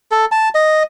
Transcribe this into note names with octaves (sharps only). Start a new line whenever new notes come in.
A4
A5
D#5